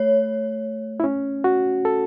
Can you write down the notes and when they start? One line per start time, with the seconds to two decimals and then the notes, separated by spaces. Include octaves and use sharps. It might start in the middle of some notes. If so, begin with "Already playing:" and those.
Already playing: A3 C#5
1.00 E4
1.04 C#4
1.44 F#4
1.85 A4